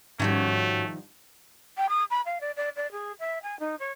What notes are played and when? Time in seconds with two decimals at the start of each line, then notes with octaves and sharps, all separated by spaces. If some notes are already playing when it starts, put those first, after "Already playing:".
0.20 G#2 D#3 F3 G3 A3 C#4 F#4 G5
1.77 G5
1.89 D#6
2.10 B5
2.25 F5
2.40 D5
2.56 D5
2.76 D5
2.92 G#4
3.19 E5
3.42 G#5
3.59 D#4
3.79 C#5